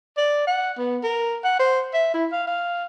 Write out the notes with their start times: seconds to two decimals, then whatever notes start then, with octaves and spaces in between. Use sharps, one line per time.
0.17 D5
0.47 F#5
0.78 B3
1.04 A#4
1.44 F#5
1.59 C5
1.94 E5
2.14 E4
2.32 F5
2.47 F5